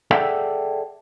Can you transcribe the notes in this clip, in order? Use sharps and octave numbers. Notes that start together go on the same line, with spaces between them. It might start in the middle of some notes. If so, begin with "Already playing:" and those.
G#4 A4 D5 E5 F#5 G5